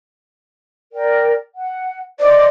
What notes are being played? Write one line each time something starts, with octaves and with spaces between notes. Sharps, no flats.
A#4 D5 G5
F#5
C5 D5 D#5 D6